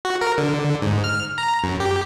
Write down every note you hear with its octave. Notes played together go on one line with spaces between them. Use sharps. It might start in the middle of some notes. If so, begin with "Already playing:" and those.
F#4
A#4
D3
G#2
F6
A#5
F#2
G4